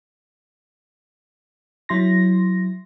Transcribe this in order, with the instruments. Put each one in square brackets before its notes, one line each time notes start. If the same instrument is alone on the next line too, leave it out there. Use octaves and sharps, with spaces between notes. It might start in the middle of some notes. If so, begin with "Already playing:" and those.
[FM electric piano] F#3 E4 C6 A#6